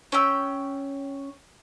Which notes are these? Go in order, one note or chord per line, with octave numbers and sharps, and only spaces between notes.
C#4 G5 E6